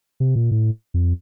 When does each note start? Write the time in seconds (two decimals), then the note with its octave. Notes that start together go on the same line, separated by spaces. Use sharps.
0.20 C3
0.36 A#2
0.51 A2
0.94 F2